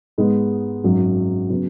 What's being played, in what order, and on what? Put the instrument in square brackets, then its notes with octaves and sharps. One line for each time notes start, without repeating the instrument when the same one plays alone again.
[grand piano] G#2 G#3 B3
G#1 F#2 F#3
C#3 F#3 B3